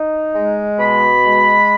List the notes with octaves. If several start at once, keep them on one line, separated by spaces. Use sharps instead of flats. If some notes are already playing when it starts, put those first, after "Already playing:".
Already playing: D#4
G#3
B2 B5
G#3